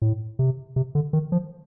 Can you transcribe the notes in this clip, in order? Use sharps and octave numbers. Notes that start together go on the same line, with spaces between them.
A2
C3
C3
D3
D#3
F3